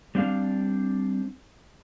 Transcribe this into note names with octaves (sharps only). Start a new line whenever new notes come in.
G3 C4 D4 F5